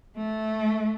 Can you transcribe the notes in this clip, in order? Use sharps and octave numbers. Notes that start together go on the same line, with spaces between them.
A3